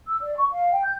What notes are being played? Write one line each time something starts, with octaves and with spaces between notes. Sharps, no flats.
E6
D5
C#6
F5
G5
G6